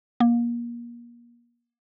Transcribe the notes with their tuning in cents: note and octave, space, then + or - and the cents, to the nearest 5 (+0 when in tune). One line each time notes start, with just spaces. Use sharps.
A#3 +30